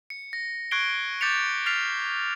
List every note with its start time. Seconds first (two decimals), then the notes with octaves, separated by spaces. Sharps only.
0.10 C#7
0.33 A#6
0.71 C#6 F#6 G#6 C7 D7 G7
1.21 D6 G6 A6 B6 C#7 F7
1.66 F6 A6 B6 C7 F7